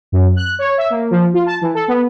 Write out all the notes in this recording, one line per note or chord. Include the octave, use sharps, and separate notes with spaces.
F#2
F#6
C#5
E5
A#3
F3
F4
A5
E3
A4
B3